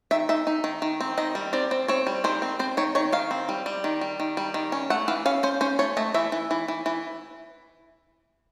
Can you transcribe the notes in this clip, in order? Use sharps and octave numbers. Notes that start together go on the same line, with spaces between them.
D#3 E5
D#4 E5
D#4
D#3
D#3
C4
D#3 D#5
G3
C4 D5
C4
C4 C#5
G3
D#3 C5
C4
C4 C5
D#3 C#5
D#3 C#5
D#3 F5
C4
G3
G3
D#3
G3
D#3
G3
D#3
C#4
A3 F#5
E3 F5
C#4 F5
C#4 C5
C#4 C5
A3 C#5
A3 D#5
E3 E5
E3
E3
E3
E3